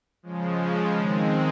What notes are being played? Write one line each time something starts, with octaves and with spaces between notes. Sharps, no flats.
C#3 F3 G#3
D#3 G#3 C4